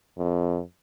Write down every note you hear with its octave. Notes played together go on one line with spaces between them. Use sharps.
F2